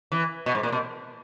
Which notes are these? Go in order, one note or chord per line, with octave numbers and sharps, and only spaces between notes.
E3
B2
G#2
A#2
B2